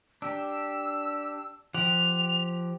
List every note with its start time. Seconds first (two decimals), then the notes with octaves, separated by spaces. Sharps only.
0.22 D4 G4 E6
1.74 F3 G4 F#5 F7